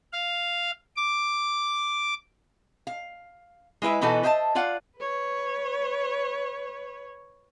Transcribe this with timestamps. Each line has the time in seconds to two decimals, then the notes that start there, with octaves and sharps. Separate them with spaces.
0.13 F5
0.96 D6
2.87 F5
3.82 G#3 E4 B4 E5
4.01 B2 E3 D#4 F#4 A4 B4
4.23 C5 D#5 E5 G5 A5
4.55 F4 D5 F5 F#5
4.98 B4 C#5